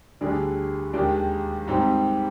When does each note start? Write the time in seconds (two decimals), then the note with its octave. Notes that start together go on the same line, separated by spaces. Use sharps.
0.21 D2 D3 G3 D4 G#4
0.93 D#2 D#3 G#3 D4 G4
1.67 G#2 G3 C4 D#4 G4